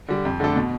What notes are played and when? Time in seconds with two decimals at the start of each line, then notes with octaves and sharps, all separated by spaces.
0.08 D3 G3
0.25 F2
0.40 D3 A3 D4 A4
0.56 B2